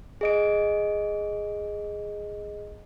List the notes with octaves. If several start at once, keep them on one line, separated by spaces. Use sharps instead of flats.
G#4 D#5 D7